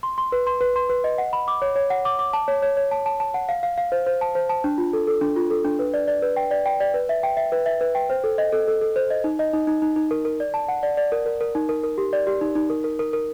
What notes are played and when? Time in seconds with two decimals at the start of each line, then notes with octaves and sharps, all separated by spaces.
0.03 C6
0.18 C6
0.32 B4
0.47 C6
0.61 B4
0.76 C6
0.90 B4
1.04 D#5
1.18 F#5
1.33 B5
1.48 D6
1.62 C#5
1.76 C#5
1.90 F#5
2.05 D6
2.19 D6
2.33 A5
2.48 C#5
2.62 C#5
2.77 C#5
2.91 A5
3.06 A5
3.20 A5
3.34 F#5
3.49 F5
3.63 F5
3.78 F5
3.92 C5
4.06 C5
4.21 A5
4.35 C5
4.49 A5
4.64 D4
4.78 F4
4.93 A4
5.07 A4
5.21 D4
5.36 F4
5.50 A4
5.65 D4
5.79 B4
5.94 D5
6.08 D5
6.22 B4
6.36 G5
6.51 D5
6.65 G5
6.80 D5
6.94 B4
7.09 E5
7.23 G5
7.37 E5
7.52 B4
7.66 E5
7.81 B4
7.95 G5
8.10 C5
8.24 A4
8.38 D#5
8.52 A4
8.67 A4
8.81 A4
8.96 C5
9.10 D#5
9.24 D#4
9.39 D#5
9.53 D#4
9.67 D#4
9.82 D#4
9.96 D#4
10.11 A#4
10.25 A#4
10.40 D5
10.54 A5
10.68 F#5
10.83 D5
10.97 D5
11.12 A#4
11.26 A#4
11.41 A#4
11.55 D#4
11.69 A#4
11.84 A#4
11.98 G4
12.13 D5
12.27 G4
12.41 D#4
12.55 D#4
12.70 A#4
12.84 A#4
12.99 A#4
13.13 A#4